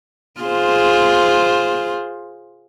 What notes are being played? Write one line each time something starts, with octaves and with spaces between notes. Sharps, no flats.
F4 G#4 C5